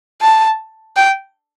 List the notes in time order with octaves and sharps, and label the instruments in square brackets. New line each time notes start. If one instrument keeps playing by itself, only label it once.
[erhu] A5
G5